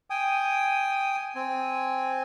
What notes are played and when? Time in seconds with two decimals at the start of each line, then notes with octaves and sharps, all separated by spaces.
0.10 G5 G#5 D#6
1.35 C4 G#5